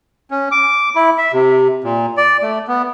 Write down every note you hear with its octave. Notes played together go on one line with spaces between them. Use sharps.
C#4
D6
E4
E5
C3
A#2
D5
A3
B3